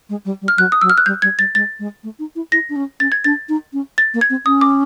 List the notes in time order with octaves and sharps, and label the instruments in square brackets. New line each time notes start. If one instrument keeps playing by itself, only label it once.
[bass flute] G#3
G3
G3
[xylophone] F6
[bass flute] F#3 [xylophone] F#6
[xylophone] D#6
[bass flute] F#3 [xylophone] E6
[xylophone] F6
F#6
[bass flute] G3 [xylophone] G6
[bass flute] G3 [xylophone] G#6
[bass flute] G3 [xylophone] A6
[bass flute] G#3 [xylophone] A6
[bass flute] G#3
A3
D#4
E4
[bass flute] E4 [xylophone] A#6
[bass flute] D4
C#4
[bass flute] C#4 [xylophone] A6
[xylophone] G#6
[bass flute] D4 [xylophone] A6
[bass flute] D#4
C#4
[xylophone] A6
[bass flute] A#3
[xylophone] G#6
[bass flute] C4
[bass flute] C#4 [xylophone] D#6
[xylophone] D6